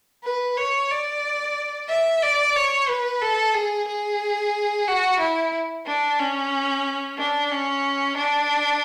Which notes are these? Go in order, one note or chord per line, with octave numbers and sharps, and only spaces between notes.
B4
C#5
D5
E5
D5
C#5
B4
A4
G#4
G#4
F#4
E4
D4
C#4
D4
C#4
D4